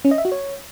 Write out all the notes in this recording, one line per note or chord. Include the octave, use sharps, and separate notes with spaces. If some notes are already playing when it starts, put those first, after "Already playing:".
C#4
D#5
E5
F#4
C#5